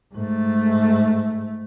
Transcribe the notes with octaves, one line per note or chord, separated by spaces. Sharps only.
G#2 A3